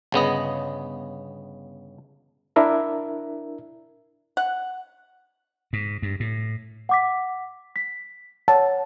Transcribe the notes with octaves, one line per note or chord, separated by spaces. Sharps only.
G1 C#3 B3 D#5
D4 E4 A#4 E5
F#5
G#2
G2
A2
F#5 D6 B6
B6
C#5 F#5 A5